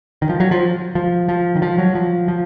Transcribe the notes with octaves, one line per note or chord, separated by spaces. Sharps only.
D#3
F3
F#3
F3
F3
F3
D#3
F3
F#3
F3
F3